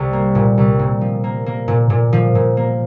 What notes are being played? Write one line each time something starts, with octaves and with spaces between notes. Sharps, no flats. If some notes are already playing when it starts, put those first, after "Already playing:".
Already playing: C2
A#3
A#2
C2
A#2
F3
A#3
A#3
A#2
A#2
F3
A#2
A#3